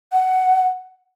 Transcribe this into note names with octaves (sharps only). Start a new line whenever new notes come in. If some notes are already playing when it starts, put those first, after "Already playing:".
F#5